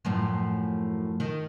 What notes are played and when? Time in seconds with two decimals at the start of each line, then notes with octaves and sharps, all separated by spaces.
0.05 F#2 A2 F3
1.20 D#3